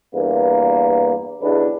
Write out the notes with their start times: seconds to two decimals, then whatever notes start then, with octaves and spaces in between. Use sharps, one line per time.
0.14 E2 G2 A#3
1.40 B1 E2 D4 B4